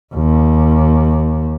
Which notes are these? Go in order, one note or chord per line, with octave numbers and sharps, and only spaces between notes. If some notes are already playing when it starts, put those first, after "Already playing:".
D#2